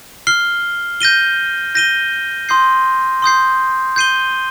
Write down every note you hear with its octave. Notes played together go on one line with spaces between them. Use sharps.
F6 C7 G7
G6 A#6 D#7 G7
G6 A#6 D#7 G7
C6 D#6 G6 C7
C6 D#6 G6 C7
G6 C7 D#7 G7